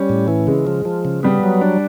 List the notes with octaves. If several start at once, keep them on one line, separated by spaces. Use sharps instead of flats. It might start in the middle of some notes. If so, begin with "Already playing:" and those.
Already playing: G3 C#4
A2
E3
C#3 G#3
F3
F3
C#3
G3 B3
F#3
D4